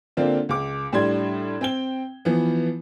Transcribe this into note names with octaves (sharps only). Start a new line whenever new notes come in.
D3 A#3 C4 D4 F4
C#2 D6
A2 G3 D4 C6 G#6
C4 G5 G7
E3 F3 B3